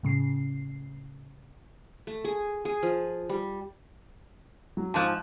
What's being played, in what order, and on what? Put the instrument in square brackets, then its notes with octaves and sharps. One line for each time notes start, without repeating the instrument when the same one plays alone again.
[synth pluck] A2 C#3 C7
[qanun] A3
G#4
G#4
F3
G3
[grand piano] F#3
[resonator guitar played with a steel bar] G#2 F3 [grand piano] A5 F#6